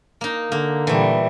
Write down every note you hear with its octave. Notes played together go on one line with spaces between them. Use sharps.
A#3 D#4
D3 A#3
A#2 E3 G3 A3